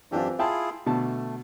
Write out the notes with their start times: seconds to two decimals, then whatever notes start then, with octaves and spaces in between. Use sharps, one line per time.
0.12 F#2 E3 C4 D4 F4 G4
0.39 E4 F4 G#4 E5 G5 A5
0.86 B2 D3 A3 A5